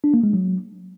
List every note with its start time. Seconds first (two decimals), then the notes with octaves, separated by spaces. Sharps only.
0.04 D4
0.14 A#3
0.24 G#3
0.33 F#3